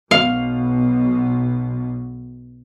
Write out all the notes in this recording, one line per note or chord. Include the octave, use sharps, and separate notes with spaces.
B1 B2 F5